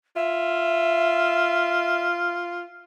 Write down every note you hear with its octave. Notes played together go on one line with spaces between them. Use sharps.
F4 E5